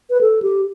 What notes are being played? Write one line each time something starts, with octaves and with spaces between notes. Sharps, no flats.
B4
A4
G4